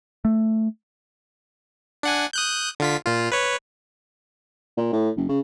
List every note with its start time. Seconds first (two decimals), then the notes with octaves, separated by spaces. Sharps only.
0.25 A3
2.03 D4 F#5 G#5
2.33 D#6 F#6 G6
2.80 D3 F4 B6
3.06 A#2 F4
3.32 B4 C#5
4.77 A#2
4.93 A2
5.17 F#1
5.28 C#3